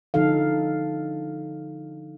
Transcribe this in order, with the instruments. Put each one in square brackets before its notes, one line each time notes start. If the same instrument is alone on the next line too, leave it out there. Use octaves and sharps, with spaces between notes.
[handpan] D3 F3 D#4 A4 F5